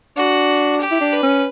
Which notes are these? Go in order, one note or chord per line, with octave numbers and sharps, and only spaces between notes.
D4 F#4
G4
E4
D4
B4
C#4